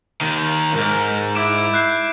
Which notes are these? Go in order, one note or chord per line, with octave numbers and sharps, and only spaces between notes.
D#2 D#3
F2 G#2 A#4
E4 D6 D7 E7
F#6 G6 C7